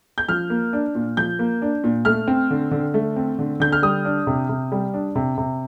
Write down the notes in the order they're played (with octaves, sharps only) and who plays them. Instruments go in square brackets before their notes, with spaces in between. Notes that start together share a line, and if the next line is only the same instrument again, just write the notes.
[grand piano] G6
F3 F6
A#3
D4
A#2
F3 G6
A#3
D4
A#2
A3 F6
C4
D3
D3
A3
C4
D3
D3 G6
F6
G3 D#6
D4
C3
C3
G3
D4
C3
C3